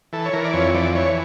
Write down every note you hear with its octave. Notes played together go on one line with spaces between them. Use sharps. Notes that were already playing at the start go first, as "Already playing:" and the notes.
E3 A4
C#5
E3 A#4
D5
F2 C#5
E3 D5
E3 C#5